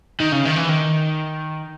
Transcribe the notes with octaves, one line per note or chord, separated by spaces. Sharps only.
D#3
C#3
D#3
E3
D#3